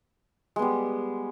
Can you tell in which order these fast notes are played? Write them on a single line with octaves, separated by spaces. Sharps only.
G#3 B3 G3